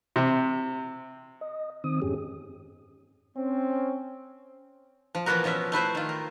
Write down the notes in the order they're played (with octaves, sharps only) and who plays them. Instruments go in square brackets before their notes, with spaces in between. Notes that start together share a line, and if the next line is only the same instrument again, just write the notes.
[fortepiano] C3
[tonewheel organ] D#5
D#3 C4 D#6
F2 G#2 C#4 G4 G#4
[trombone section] C4 C#4
[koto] F3
E3 F3 A#3 B3 F#4 A#4
B2 F3 C#4 E5
A3 E4 B4 C5
D#3 F4
A#4